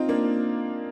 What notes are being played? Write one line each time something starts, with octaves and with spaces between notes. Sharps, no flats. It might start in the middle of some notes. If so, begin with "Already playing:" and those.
Already playing: C4 D#4 F4
A#3 D4